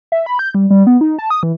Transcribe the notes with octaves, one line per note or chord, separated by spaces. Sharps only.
E5
B5
G6
G3
G3
B3
D#4
A5
D#6
E3